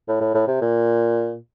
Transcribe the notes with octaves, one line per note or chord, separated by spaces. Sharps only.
A2
A2
A2
C3
A#2